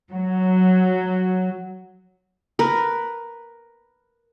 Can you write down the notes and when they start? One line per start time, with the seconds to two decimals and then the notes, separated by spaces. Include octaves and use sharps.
0.11 F#3
2.59 A#4 B4